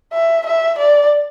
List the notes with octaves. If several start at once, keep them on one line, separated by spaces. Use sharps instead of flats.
E5
E5
D5